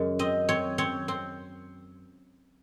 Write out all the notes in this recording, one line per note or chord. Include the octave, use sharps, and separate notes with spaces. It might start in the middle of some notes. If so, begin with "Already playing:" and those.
Already playing: F#2 C#3 G#3
C4 D#5
C4 C#5
C4 C#5
C4